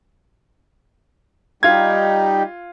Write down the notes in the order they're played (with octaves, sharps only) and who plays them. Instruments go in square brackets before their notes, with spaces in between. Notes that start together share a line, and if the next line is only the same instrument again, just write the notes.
[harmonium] G3 D#4 G4 [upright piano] F4 G#6